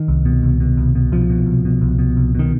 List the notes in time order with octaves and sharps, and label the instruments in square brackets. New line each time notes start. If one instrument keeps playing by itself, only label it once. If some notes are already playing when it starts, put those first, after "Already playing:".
Already playing: [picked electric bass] D#3
C2
B2
C2
B2
C2
B2
C2 F3
B2
C2
B2
C2
B2
C2
B2 D#3